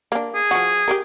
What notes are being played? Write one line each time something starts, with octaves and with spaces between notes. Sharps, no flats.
A#3 D4
G#4
F3 F#4
G4 A4 A#4